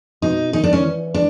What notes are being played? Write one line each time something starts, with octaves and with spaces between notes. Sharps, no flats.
B2 D#4
D#3 D#4
D4
C#4
E3
D4